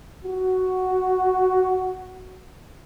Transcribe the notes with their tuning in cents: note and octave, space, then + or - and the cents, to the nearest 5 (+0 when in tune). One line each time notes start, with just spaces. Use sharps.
F#4 +5